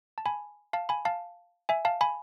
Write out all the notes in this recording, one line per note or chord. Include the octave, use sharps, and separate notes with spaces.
A5
G#5 B5
F5 A5
G#5 B5
F5 A5
E5 G#5
F5 A5
G#5 B5